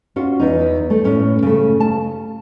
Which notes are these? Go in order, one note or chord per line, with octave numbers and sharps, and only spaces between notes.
C#4 F4 F#4
E2 D#4
A3
A2 C#4
C#3 A3
A5